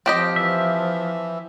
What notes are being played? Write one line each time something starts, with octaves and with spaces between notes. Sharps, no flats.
F3 C4 G4 D#5
E3 E5